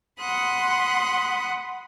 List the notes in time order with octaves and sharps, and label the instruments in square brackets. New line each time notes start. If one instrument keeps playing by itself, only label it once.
[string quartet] F#5 B5 C6 D#6 F#6